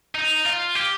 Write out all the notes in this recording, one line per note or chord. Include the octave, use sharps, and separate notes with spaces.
D#4
F4
G4